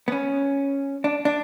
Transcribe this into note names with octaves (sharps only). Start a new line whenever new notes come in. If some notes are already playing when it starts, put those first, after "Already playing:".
B3
C#4
D4
D4